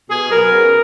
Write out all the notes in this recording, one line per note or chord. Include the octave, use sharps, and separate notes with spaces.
B2 G#4
F#3 B3 A#4
C#3